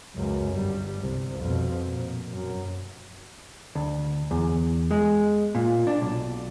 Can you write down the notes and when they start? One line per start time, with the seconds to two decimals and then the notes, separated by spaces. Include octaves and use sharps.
0.16 C#2 F#2
0.54 G1 G3
1.01 C2
1.40 F2 B2
1.86 A#2
2.32 F#2
3.75 D2
4.31 E2
4.91 G#3
5.55 A#2
5.87 D4
6.02 B1